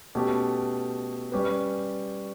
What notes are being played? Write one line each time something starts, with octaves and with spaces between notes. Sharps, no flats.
B2 A3 C#4 G4
G3 C#4 G4 B4